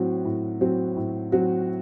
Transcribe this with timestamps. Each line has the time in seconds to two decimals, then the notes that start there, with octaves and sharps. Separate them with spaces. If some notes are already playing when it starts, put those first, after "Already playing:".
Already playing: A2 F#3 C4 F#4
0.25 A2
0.61 F#3 C4 F#4
0.96 A2
1.32 F#3 C4 F#4